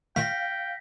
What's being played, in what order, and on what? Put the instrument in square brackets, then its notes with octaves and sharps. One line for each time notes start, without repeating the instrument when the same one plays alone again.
[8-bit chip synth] A#2 D#3 A3 [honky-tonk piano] F5 [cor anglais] G5 [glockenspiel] A#6 B6